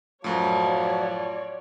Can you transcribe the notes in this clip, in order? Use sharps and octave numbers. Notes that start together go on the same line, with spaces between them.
F#2 A2 F3 F#3 C#5 D5